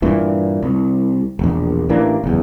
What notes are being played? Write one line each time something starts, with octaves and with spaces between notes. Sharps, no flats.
G2 A#2 E3
C2
E1 A#1
A1 E3 A#3 D4
F#1 E2